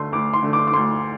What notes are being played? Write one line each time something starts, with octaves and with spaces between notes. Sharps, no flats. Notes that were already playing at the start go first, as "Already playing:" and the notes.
Already playing: D2 D3 A3 C6
D2 D6
C6
D3 A3
D6
D6
D2 C6